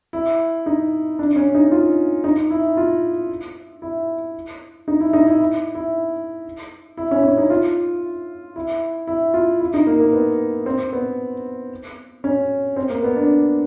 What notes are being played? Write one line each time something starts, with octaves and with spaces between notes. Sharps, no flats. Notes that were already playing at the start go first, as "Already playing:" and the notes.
E4
D#4
D4
C#4
D#4
F4
D#4
E4
F4
E4
D#4
E4
D#4
E4
E4
E4
E4
C#4
C#4
D#4
F4
E4
E4
F4
E4
D#4
A#3
A#3
B3
C4
B3
C#4
C4
A#3
B3
D4